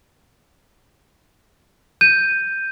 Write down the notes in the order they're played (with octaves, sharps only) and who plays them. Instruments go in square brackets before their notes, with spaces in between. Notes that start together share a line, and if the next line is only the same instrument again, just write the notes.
[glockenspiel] G6 [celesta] D#7